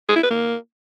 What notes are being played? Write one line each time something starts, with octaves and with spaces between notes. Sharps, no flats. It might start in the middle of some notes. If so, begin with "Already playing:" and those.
G#4
E4
B4
A#3